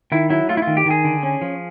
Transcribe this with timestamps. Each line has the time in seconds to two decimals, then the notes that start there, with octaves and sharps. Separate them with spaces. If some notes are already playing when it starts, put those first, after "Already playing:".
0.12 D#3 E4
0.30 F#3 E4
0.49 A3 F4
0.57 E4
0.62 F4
0.67 D#3
0.77 G4
0.86 D#3 G#4
1.04 D3
1.23 C#4
1.42 F3